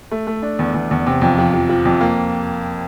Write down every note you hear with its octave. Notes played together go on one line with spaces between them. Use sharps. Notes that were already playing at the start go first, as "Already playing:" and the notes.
A3
A3
D4
E2
E2
E2
C3
F2
F3
F3
F3
F2
A#3